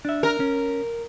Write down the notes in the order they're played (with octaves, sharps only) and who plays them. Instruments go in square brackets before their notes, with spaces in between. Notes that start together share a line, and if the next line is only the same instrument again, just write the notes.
[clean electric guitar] D4 E5
[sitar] A#4
[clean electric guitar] C#4